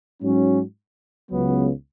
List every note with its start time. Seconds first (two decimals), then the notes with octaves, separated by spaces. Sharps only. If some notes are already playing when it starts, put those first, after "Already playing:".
0.21 G#2 F#3 C#4 F#4
1.31 C#2 C#3 F#3 B3